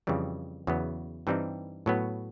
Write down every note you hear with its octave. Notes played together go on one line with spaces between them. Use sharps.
F2 C#3 E3 G3
E2 C#3 F#3 B3
G2 E3 G3 C4 D#4
A2 F#3 B3